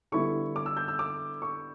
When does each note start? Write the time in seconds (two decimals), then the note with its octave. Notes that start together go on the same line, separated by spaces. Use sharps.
0.12 D3 G3 B3 E4 C#6
0.56 D6
0.66 E6
0.77 G6
0.88 E6
0.99 D6
1.42 C#6